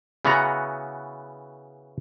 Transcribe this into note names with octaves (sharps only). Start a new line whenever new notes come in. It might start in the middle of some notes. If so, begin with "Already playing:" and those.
C#3 E3 B3 F#4 F#5 A#5